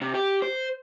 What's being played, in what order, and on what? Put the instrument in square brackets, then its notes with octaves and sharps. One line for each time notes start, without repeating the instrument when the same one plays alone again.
[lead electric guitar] C3
G4
C5